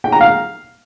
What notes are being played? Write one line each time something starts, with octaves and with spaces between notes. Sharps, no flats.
G5
A#5
F5